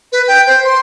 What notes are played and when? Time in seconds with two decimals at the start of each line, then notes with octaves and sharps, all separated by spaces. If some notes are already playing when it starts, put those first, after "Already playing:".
0.12 B4
0.28 G5
0.47 C5
0.64 C6